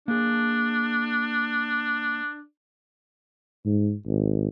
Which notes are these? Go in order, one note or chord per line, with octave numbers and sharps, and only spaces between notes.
A#3 D4 G#4
G#2
G#1